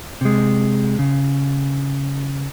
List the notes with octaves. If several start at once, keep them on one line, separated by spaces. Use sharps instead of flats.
C3 G#3
C#3